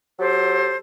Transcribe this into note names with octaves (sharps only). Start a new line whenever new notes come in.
F#3 G4 A4 C5